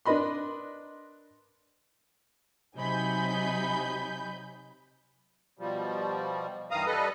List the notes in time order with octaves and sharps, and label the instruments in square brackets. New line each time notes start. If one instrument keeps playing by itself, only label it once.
[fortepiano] D4 A#4 B4 D#5 B5 C6
[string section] C3 F#3 D#4 G#5 B5 G6
[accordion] B2 F3 G3
G2 D#3 E3 F5 A#5 D#6
G3 A4 B4 D#5